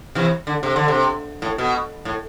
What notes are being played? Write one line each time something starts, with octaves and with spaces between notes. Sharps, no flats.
C3 E3
D3
C3
D3
C3
A2
B2
A2